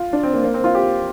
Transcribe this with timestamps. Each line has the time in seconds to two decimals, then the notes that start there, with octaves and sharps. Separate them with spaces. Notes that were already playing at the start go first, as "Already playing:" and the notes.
Already playing: F4
0.13 D4
0.23 C4
0.34 A#3
0.44 A#3
0.54 C4
0.64 F4
0.75 G4